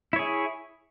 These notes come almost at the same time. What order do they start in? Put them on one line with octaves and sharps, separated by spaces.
E4 C#5 G#4